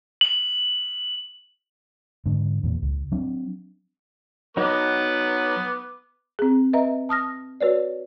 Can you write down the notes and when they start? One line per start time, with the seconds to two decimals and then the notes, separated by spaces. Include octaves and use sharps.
0.21 F#7
2.26 G#2 D3
2.63 E2 A#2
2.82 C#2
3.12 F#3 C4 D4
4.57 F#3 B3 D#4 B4 D6
6.39 C4 G#4
6.73 B4 D#5 E5 A#5
7.09 A5 D#6 F6 A#6
7.61 F#4 B4 C#5 D5